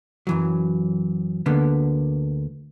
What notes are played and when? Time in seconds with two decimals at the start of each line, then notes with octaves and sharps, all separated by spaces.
0.27 F#2 E3 F#3
1.46 D2 D3 A#3 B3